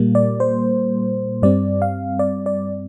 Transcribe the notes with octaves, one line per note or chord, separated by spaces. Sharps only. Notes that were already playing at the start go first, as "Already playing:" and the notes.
Already playing: A#2 G3 A#3
D5
C5
G2 G3 C4 D5
F5
D5
D5